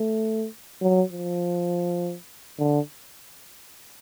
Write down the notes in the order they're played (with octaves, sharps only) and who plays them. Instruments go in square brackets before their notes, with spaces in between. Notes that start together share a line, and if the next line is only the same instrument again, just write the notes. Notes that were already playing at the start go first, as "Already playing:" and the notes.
Already playing: [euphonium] A3
F#3
F3
D3